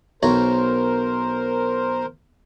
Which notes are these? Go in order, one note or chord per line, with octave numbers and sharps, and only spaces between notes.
B1 A#4 C5 C#5 A#5